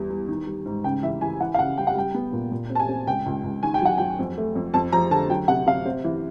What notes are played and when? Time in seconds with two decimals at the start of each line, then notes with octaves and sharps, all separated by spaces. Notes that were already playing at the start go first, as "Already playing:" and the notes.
Already playing: E2 G3
0.10 G3
0.28 D#3
0.47 G3
0.66 G#2
0.84 C#3 G5
1.03 E3 E5
1.21 E3 G#5
1.40 E3 F#5
1.54 F5
1.59 C#3 F#5
1.77 G3 G5
1.87 F#5
1.95 G3 G5
2.14 B3
2.33 A#2
2.51 A#2
2.70 C4
2.75 A5
2.79 G#5
2.89 C4
3.07 C#2 G5
3.26 C#2
3.44 C#2
3.63 D#3 G#5
3.74 G5
3.82 F#3 F#5
3.98 F#3 G5
4.19 F2
4.37 A3
4.55 F2
4.74 F2 A5
4.92 F3 A#5
5.11 D3 A5
5.30 F#3 G5
5.48 C3 F#5
5.66 C3 F5
5.85 C4
6.04 E3